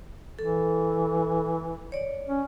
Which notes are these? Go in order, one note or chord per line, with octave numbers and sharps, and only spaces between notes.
E3 A4
C#5 D5
C#4